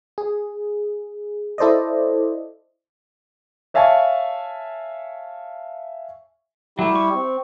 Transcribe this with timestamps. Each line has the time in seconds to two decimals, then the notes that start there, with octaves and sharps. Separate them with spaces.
0.18 G#4
1.58 E4 A4 C5 D5 D#5
3.74 C#5 E5 F5 G#5 A5 C#6
6.79 F#3 G3 A3 E4 G4
6.95 C#6
7.14 C4